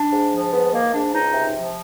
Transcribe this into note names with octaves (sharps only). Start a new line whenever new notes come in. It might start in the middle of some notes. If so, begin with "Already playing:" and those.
Already playing: D4
G#2
F3
G#2 B3
D#3 A#3
G#2 D4
C#2 D#4
C3
F3